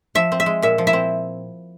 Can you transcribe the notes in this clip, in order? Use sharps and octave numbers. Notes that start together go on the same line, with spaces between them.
F3 E5
C4
E5
G#3
A#2 E5
F3
E4 E5
C4